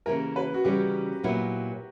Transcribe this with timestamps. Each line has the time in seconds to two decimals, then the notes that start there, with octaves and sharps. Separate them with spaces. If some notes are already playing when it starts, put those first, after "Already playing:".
0.06 C#3 E3 A#3 E4 G4 A#4
0.36 B4
0.54 F#4
0.64 C#3 E3 G3 C#4 G4
1.23 A#2 F#3 B3 E4